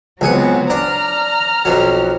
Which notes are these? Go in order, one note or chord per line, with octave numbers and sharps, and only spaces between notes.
C#2 F#3 B3 C4 G#4 F#5
D4 A#5 F6
B1 F2 F#3